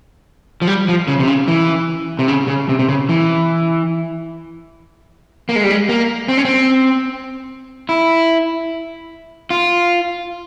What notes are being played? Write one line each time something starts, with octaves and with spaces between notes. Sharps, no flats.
F3
G3
F3
C#3
C3
C#3
E3
C3
C#3
C#3
C3
C3
C#3
E3
A#3
G#3
G3
G#3
A#3
C4
C#4
C4
E4
F4